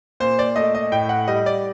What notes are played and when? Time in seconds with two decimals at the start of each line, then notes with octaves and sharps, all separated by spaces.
0.20 A#2 C5
0.39 D5
0.56 A3 D#5
0.75 D#5
0.92 A2 G5
1.09 F#5
1.28 G3 D#5
1.46 D5